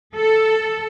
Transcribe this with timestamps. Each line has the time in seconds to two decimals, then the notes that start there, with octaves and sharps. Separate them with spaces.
0.15 A4